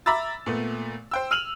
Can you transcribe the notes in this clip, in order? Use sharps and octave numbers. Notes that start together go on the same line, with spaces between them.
E5 A#5 B5 D6 E6 A6
A#2 A3 B3
C5 G5 E6
E6 F6 D#7 F7 F#7